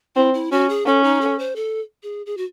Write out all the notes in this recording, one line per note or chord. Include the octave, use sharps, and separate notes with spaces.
C4 E4
E4
C#4 F#4
G#4
C#4 A4
D#4
A4
C5
A4
G#4
G#4
F#4